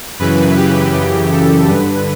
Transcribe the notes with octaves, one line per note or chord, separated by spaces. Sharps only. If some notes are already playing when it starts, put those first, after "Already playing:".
F#2 C#3 E3 B4
G4
F#2 C#3 E3 G4
A4
G2 D3 B4